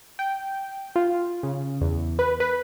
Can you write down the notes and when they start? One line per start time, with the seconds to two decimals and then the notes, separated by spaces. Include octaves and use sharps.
0.19 G5
0.96 F4
1.43 C#3
1.81 E2
2.19 B4
2.40 B4